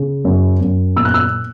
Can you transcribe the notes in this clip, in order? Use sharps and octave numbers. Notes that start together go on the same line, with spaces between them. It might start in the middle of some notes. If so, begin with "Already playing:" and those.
Already playing: C#3
F#2
F#2
A#2 E6
F#6
E6